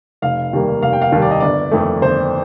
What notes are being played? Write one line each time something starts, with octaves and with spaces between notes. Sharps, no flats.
F1 F5
D#2 D#3 G3 A#3
F1 F5
G5
F5
D#2 D#3 G3 A#3
D5
D#5
G1 D5
F2 D#3 A3
G1 C5